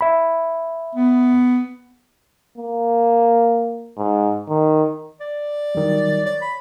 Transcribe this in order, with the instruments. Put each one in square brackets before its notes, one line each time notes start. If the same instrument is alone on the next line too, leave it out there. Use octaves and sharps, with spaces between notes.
[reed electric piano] E5 B5
[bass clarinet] B3
[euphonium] A#3
G#2
D#3
[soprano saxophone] D5
[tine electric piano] D#3 F#3 G3
[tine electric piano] C#5 [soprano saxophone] D5
[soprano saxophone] B5